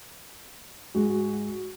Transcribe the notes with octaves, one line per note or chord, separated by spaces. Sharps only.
G#2 G#3 F#4